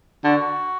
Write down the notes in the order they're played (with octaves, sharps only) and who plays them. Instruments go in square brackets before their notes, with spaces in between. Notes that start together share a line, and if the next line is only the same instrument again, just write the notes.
[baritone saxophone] D3 [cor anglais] F#4